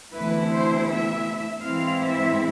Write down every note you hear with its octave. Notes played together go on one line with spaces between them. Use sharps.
D2 C3 E3 B3 E4 B4
C5
E5
G#2 E3 G#3 C4 E4 F5
E5